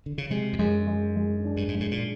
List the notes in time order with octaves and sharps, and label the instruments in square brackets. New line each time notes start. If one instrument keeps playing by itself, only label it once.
[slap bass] D3
C#3
[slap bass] C3 [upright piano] G#3
[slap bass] F2
[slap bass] F#2 [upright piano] G#3
[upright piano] G#3
G#3
D4
[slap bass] G2
G#2
[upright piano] G#3
[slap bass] A2
A#2